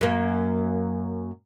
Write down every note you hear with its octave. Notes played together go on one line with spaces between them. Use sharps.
F#2 A#3